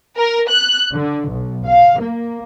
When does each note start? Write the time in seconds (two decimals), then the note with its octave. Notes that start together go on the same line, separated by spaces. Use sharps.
0.17 A#4
0.49 F#6
0.92 D3
1.28 B1
1.67 F5
1.99 A#3